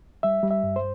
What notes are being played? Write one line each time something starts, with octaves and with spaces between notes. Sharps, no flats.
G3 E5
G3
E5
G2
C5